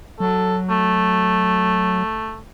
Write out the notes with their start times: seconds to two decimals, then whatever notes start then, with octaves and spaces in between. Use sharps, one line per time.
0.20 F#3 A4
0.70 A3